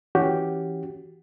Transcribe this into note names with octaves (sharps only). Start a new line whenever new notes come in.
E3 C#4 F#4 G4